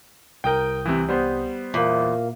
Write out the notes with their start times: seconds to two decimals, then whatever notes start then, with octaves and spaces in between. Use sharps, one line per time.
0.44 C2 A#4 G5 D#6 G6
0.86 C3 E3
1.09 G3 B3 C5
1.74 E2 A#2 A#3